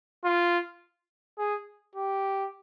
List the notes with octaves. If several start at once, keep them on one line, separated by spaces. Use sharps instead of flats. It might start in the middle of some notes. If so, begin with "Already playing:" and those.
F4
G#4
G4